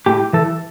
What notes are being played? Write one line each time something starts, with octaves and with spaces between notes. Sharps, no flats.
A2 G4
E3 A4